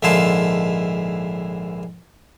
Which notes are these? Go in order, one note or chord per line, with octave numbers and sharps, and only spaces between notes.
A#1 G#2 D3 E4 F4 A5